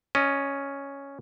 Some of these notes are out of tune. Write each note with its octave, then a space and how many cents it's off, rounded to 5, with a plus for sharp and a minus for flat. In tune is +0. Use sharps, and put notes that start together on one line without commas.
C#4 +0 D#5 -15